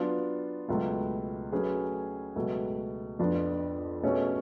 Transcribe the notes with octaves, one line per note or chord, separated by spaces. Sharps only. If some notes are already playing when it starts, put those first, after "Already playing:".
Already playing: F#3 B3 D4 F4
C#2 B2 F#3 A3 F4
F#3 A3 C#4 G#4 B4
C#2 B2 F#3 A3
F2 F3 B3 D4 F4
B2 A3 C#4 G#4 C#5